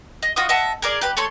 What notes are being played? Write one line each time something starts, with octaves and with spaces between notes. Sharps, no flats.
D#5
F4 F#4 D#5 D#6
D#5 E5 F#5 A5
G#4 A#4 D5
G4 B4
A3 A4 C#5 C6